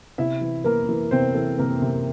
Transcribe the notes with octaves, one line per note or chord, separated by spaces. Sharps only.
C3 E4 E5
E3
E3 A#3 A#4
E3
C3 C4 C5
E3 A4
C3 A#3 A#4
C3